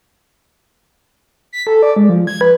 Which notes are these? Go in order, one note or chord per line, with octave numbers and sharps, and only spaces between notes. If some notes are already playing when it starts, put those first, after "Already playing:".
B6
A4
D5
G#3
F3
G#6
B4